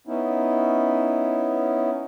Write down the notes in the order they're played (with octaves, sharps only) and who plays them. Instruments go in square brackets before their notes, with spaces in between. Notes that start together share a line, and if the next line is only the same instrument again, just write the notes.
[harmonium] B3 C#4 D#4 E4